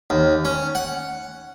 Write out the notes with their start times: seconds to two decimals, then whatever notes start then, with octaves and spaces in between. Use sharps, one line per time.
0.10 D#2
0.45 C#4
0.75 F#5